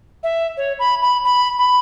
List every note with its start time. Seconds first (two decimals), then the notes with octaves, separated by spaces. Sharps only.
0.23 E5
0.57 C#5
0.79 B5
1.02 B5
1.24 B5
1.58 B5